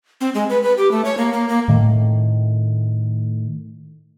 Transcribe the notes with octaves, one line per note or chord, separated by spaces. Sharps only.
C4
G#3
B4
B4
G4
A3
C#5
A#3
A#3
A#3
A2 D#3 A3